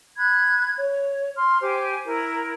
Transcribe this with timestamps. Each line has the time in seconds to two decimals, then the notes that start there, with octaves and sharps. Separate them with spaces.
0.16 B5 F#6 G#6
0.78 C#5
1.36 C6 F6
1.61 G4 C5 G#5 D6
2.05 E4 A#4